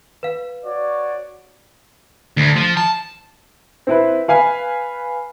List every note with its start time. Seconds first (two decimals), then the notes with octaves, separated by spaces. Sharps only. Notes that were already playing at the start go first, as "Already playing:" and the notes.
0.23 B4 F5
0.65 F#4 C#5 D5
2.37 D2
2.56 F3
2.77 A5
3.87 C4 E4 B4
4.28 B4 F5 G#5 B5